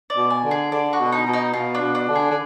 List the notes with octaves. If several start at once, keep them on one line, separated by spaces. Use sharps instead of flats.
D5
B2
G#5
D3
G#4
D3 D5
F#4
B2
D#4
B2
D#4
B2 F4
D4
B2
D4
D3
G#4
D3